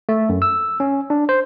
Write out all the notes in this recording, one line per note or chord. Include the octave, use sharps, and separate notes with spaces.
A3
F#2
E6
C#4
D4
C5